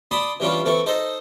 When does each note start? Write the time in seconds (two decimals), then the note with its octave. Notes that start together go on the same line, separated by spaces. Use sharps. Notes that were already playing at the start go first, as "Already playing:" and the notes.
0.11 D5 A5 B5 C6 D#6
0.40 E3 G3 C#4 D4 F4
0.65 E3 C4 A4 C#6
0.86 D#4 A4 C5 D#5